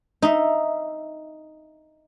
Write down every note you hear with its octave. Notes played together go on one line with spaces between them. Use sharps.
D#4 E5